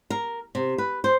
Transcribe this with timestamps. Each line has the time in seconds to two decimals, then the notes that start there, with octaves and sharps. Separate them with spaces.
0.10 A#4
0.55 C3
0.78 B4
1.04 C5